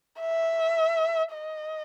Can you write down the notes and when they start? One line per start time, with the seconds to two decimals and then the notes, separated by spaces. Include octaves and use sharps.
0.20 E5
1.33 D#5